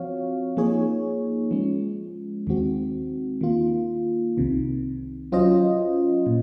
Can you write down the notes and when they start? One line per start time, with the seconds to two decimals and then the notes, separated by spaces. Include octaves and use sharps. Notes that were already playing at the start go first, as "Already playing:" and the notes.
Already playing: F3 C4 F#4 C#5 F5
0.57 F3 A#3 D#4 G#4 C#5
1.51 F3 G#3 C#4
2.47 D#2 D#3 G#3 C4 F#4
3.41 D#3 A#3 F4
4.37 C2 C3 D#3
5.32 F#3 C#4 F4 C5 D#5
6.26 A#2